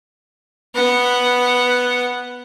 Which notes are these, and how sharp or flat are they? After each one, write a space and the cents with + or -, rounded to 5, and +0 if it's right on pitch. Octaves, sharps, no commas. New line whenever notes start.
B3 +0 F#5 +0